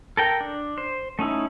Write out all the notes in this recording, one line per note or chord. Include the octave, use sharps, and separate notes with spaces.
A4 A#4 G5
D4
C5
A3 C#4 D#4 E4